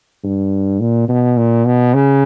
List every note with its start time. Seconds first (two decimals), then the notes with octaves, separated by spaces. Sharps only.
0.24 G2
0.80 A#2
1.09 B2
1.37 A#2
1.66 B2
1.94 C#3